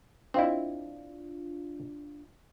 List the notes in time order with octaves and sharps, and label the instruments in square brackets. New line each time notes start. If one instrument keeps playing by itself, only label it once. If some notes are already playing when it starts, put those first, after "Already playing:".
[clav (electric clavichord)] C4 E4 [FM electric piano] D4 F4 [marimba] D#5 F5 C6